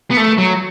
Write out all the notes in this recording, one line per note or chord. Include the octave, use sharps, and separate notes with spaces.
B3
A3
F#3